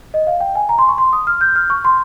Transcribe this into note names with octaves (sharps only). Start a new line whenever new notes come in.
D#5
F5
G5
G#5
A#5
C6
C#6
C6
D#6
F6
G6
F6
C#6
C6